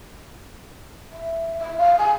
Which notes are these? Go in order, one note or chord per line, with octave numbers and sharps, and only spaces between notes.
E5
E5
F5
G#5